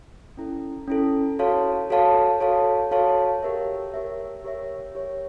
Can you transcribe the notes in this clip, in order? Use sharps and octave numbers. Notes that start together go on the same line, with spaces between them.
C#4 E4 A4
C#4 E4 A4
F#4 A4 C#5 F5 A5
F#4 A4 C#5 F5 A5
F#4 A4 C#5 F5 A5
F#4 A4 C#5 F5 A5
G4 A#4 C#5 E5
G4 A#4 C#5 E5
G4 A#4 C#5 E5
G4 A#4 C#5 E5